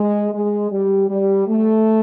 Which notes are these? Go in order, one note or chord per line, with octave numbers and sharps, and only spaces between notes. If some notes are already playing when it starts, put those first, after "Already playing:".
Already playing: G#3
G#3
G3
G3
A3